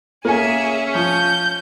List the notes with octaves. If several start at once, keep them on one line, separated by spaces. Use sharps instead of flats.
A#3 C#4 G#4 E5 G#5
F3 G6